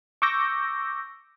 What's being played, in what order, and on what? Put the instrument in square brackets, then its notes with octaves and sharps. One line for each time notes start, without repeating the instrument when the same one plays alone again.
[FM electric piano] C#6 D6 E6 G6 A#6